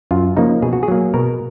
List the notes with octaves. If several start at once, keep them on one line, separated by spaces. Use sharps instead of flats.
F#2 F4
C#3 F3 A#3 D#4
B2 G#4
F#4
G#4
F#3 A#3
B2 A#4